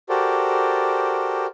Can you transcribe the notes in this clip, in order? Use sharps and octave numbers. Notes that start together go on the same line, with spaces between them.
F#4 G4 A4 A#4 C5 D5